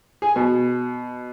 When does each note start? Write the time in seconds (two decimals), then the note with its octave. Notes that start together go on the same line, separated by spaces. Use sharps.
0.22 G#4
0.36 B2